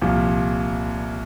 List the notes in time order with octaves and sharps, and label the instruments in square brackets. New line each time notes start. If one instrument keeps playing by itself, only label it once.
[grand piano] C2 A#2 F3